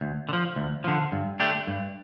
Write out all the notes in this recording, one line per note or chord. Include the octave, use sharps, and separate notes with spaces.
D2
D3
F3
D2
D3 F3
G2
D3 A3 D4 G4
G2